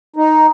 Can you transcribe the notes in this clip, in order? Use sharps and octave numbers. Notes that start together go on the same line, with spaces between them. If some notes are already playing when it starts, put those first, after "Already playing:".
D#4